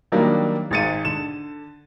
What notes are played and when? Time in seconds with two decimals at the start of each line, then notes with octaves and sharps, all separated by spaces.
0.12 D#3 F#3 G3 A#3 D4
0.71 G#1 G#2 A6 C#7 D#7
1.05 D3 E7